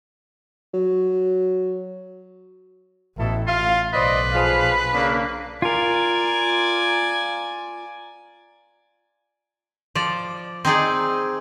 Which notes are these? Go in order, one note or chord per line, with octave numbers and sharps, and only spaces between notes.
F#3
A1 B2 E4 A4
F4 F5
B1 B4 C5 D5 D#5
F3 G#4 F5
C#3 A#3 D4
F4 A#4 D5 G#5
F3 D5
C4 D#4 G#4 D5